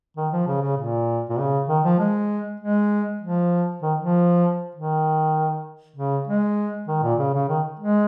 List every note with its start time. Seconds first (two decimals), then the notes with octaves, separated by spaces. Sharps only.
0.17 D#3
0.33 F3
0.48 C#3
0.62 C#3
0.77 A#2
1.30 A#2
1.39 C#3
1.69 D#3
1.85 F3
1.99 G#3
2.60 G#3
3.22 F3
3.82 D#3
3.99 F3
4.75 D#3
5.96 C#3
6.27 G#3
6.88 D#3
7.03 A#2
7.19 C#3
7.34 C#3
7.49 D#3
7.80 G#3